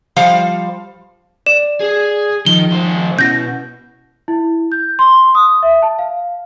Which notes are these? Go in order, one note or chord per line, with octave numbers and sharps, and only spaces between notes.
F3 G3 C5 F5
D5 E7
G#4
D#3 F3 G7
D#3 C5
B2 C#4 E4 G6 A#6
E4
G6
C6
D#6
E5
A5
F5